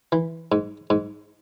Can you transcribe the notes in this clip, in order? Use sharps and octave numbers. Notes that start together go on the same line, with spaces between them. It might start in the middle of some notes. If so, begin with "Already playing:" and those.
E3
G#2
G#2